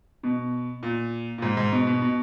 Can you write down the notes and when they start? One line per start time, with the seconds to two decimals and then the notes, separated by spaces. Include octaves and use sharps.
0.23 B2
0.83 A#2
1.38 A#2
1.42 G#2
1.57 G#2
1.72 B2
1.87 B2
2.02 B2